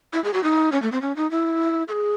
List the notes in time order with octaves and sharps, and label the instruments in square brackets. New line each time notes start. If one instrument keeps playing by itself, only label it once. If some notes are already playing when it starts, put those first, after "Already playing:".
[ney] E4
G#4
F#4
D#4
C#4
A3
C4
C#4
D#4
E4
A4
G#4